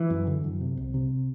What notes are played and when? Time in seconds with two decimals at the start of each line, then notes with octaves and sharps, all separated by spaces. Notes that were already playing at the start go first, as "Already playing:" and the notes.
Already playing: E3
0.10 F#2
0.27 D3
0.44 F#2
0.61 C3
0.77 C2
0.94 C3